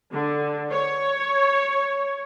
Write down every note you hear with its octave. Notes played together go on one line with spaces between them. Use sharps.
D3
C#5